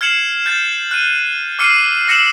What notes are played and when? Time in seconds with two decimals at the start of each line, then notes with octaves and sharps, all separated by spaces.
0.01 F6 G#6 C7 C#7 E7 F#7
0.46 G6 A6
0.91 F#6 D#7
1.59 D6 E6 F6 C7 C#7 D#7
2.08 E6 A#6 C#7 E7 F#7